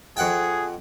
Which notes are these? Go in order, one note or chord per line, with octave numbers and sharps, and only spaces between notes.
F2 G#4 F#5 G5